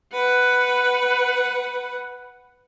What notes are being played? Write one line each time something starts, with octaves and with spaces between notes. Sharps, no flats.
B4 F#5